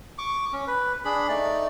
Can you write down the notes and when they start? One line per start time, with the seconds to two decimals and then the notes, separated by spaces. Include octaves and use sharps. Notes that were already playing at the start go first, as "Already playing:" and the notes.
0.18 C#6 D6
0.53 C#4
0.67 B4
1.05 D4 G#4 B5
1.29 A3 D#4 D5